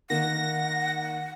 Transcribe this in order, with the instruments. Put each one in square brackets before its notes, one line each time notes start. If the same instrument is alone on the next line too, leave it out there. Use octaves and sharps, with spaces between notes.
[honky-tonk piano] D#3 A#3 [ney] F#5 [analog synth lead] A#6